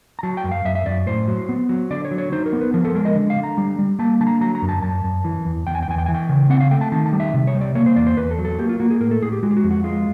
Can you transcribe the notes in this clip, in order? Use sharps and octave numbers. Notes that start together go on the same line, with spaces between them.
A#5
F#3 A5
G5
F#2
F5
F#2 E5
E5
F#2 D5
A2 C5
F#3
B3
F#3
D3 D5
C#5
F#3
C#5
D#4 C5
A#4
B3
B4
F3 A#4
A4
G#3 A#4
D#5
D3
F5
D3
A#5
G3
G3
A#3 A5
D3 A5
A#5
F#3 A#5
A#5
F#2
A5
F#2 A5
F#2
E3
E2
E2 G5
G#5
G5
E2 G#5
G5
E3 G#5
G5
C#3
C4 F#5
F5
A3 G5
A5
D#3 A5
A5
G3
E5
C3
C#5
G3
D5
A#3 C#5
C5
E2 D5
C5
E2 B4
A4
F#3
A4
A#3 G4
F4
A#3 F#4
G#4
A2 A#4
A4
A2 G#4
G4
G#3 F#4
G4
F#4
F2
F#4
G#3 F4